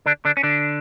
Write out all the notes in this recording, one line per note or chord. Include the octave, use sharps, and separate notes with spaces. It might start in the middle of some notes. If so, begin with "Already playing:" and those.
D3 D4
D3 D4
C#4
D3 D4